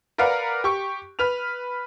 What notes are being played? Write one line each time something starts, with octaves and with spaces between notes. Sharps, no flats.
A#4 B4 D5 F5 F#5 A#5
G4 C#6
B4 F6 F7